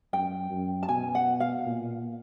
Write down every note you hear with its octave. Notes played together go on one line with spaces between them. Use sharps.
F#2 G5
F#2
A5
B2 G#5
F#5
F5
A#2